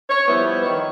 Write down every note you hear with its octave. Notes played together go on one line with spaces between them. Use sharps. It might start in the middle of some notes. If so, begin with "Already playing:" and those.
C#5
F3 G3 B3 E4
D#3 C#5